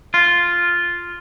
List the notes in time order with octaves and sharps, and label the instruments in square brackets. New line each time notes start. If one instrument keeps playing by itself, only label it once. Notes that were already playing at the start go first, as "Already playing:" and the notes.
[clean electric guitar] F4